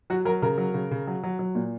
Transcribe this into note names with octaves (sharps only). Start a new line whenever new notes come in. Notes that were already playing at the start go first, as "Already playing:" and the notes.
F#3 F#4
F#3 A#4
C#3 A#4
F#3
C#3
C#3
F#3
F#3
F#3
A#2